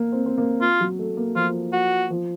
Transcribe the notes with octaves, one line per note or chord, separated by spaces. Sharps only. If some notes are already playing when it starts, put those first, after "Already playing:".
Already playing: A#3
C4
C4
A#3
F4
F#3
A3
A#3
F3 F4
F#4
F3